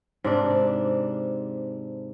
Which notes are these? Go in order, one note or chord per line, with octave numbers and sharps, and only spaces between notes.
G#2 C3 D4